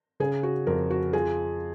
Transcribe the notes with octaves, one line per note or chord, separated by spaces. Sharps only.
C#3 G#4
F#4
F2 A#4
F#4
F3 G#4